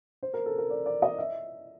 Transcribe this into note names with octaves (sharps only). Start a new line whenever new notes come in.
C5
A#4
A4
A#4
D5
D5
D#5
E5